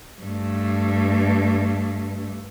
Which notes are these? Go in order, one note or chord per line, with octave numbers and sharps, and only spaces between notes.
G2 A3